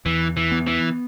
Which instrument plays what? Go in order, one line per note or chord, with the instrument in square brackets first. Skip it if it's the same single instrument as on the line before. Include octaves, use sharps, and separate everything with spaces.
[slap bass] E2 [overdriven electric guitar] E3
[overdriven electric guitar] E3
[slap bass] B3
[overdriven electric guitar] E3